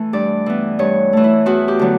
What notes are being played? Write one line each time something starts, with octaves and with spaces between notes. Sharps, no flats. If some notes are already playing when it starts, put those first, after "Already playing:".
Already playing: E3 A3
G2 D5
E3 B3
G2 C#5
E3 A3
E4
E2 F#4
G4
D3 F#3 B3